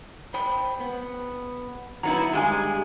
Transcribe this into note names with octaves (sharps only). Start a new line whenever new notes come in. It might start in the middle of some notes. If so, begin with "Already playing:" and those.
C5 G5 B5
B3
F#3 B3 D#4 E4 A#5
G2 G#3 G4 G#5